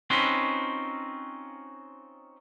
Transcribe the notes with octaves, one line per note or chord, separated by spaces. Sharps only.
C4 C#4 D#4 F4 F#4 B4